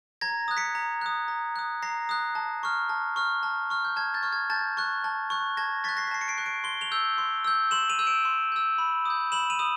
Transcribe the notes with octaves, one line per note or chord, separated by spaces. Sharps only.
A#5 G#6 A#6
D#6 F#6
B6 C#7
A#5
D#6 F#6
A#5
D#6 F#6
A#5 A#6 C7
D#6 F#6
A5
C#6 F6
A5
C#6 F6
A5
C#6 F6
G6
A5 G#6
G6 A6
C#6 F6
G#6
A5 G6 A6
C#6 F#6
A5
C#6 F#6
A5 G#6 A#6
C#6 F#6 A6 B6
A#6 C7
B6
A5 C7
C#7
C7 D7
C#6 F#6
C7 D7
C6 G7
F7 G7
E6 G6
C6
E6 G6
C6 E7 F#7
D#7 F7
E6 G6
D7 E7
C6
E6 G6
B5
D#6 G6
B5 E7 F#7
D#7 F7
D#6